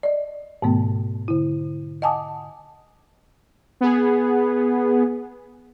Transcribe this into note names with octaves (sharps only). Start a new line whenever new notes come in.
D5 D#5
G#2 B2 D#3 A3 B3
D3 E4
D#5 F#5 G#5 A5 D6 D#6
B3 G#4